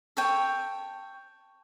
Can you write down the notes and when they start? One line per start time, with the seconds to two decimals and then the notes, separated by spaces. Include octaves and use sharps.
0.17 A4 C#5 G5